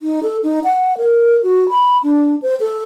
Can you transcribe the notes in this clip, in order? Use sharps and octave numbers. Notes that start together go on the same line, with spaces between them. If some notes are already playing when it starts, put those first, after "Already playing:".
D#4
A4
D#4
F#5
A#4
F#4
B5
D4
C5
A4